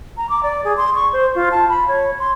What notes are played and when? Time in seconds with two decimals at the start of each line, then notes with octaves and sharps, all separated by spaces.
0.17 A#5
0.29 D6
0.43 D5
0.65 G#4
0.77 C6
0.95 C#6
1.13 C5
1.35 F4
1.52 A5
1.69 B5
1.88 C#5
2.20 C6